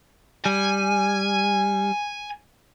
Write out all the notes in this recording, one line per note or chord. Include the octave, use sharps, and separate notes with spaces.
G3 G#5